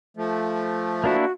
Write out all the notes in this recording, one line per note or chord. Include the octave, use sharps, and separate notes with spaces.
F3 A3
A#3 D4 E4 F#4